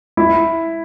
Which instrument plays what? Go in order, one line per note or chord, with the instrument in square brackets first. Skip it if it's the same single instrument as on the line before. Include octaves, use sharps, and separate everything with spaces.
[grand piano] E4